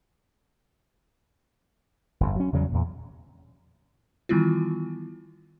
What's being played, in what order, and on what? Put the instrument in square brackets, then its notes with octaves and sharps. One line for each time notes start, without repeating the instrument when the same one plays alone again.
[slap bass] G1 F2
F#3 C#4
E2 C#3 F#3 G3
E2 A#2
[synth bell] D#3 E3 G3 B3 E4 F4